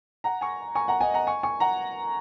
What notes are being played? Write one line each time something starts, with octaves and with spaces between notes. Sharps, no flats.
F#5 A#5
G#5 C#6
G#5 C#6
F#5 A#5
D#5 G#5
F#5 A#5
G#5 C#6
G#5 C#6
F#5 A#5